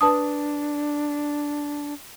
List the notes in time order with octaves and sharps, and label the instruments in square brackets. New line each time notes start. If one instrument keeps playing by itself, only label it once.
[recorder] D4 [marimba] B4 A5 D#6